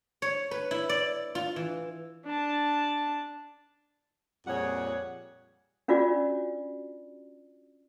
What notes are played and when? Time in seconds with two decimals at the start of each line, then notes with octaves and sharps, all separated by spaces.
0.22 C#5
0.51 B4
0.71 E4
0.89 D5
1.35 F4
1.56 E3
2.25 D4 A5
4.47 F2 A#2 G3 G#4 C#5 F#5
5.88 C#4 D4 F4 F#4 D5